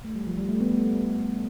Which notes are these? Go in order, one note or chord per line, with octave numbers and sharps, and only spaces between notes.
A3
G3
F3
G3
A3
B3
A3